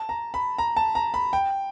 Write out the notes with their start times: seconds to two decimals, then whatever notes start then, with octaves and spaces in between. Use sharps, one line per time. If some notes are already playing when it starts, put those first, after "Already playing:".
Already playing: A5
0.09 A#5
0.34 B5
0.58 A#5
0.77 A5
0.95 A#5
1.14 B5
1.33 G5